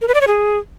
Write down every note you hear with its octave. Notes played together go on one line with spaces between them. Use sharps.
A#4
B4
D5
C#5
G#4